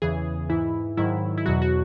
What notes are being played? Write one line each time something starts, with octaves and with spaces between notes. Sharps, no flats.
E2 C#3 E3 G#4
G#2 E3 E4
G#2 D#3 F#3 E4
E4
E2 B2 F#3 F#4
F#4